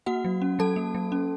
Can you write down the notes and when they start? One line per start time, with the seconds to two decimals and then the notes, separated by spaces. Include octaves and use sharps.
0.06 A#3 F#4 F#5
0.25 F#3
0.42 C#4
0.59 F#3 A4 A5
0.76 A#3
0.95 F#3
1.12 C#4